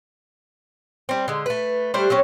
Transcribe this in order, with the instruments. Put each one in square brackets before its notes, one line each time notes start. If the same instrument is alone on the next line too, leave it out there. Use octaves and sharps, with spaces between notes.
[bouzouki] G3 C4
D3 G#3
A3 B4
G3 A3 D4 C5
F#3 C4 C#4